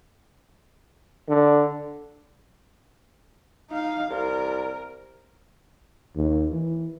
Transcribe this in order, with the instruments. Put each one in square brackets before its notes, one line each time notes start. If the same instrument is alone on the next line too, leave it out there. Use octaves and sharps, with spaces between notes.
[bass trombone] D3
[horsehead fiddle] D#4 F5
[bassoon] C2 [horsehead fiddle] A#4
[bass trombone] D#2
E3